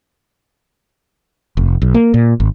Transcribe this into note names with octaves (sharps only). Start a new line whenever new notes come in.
F1
B1
A#3
A#2
G#1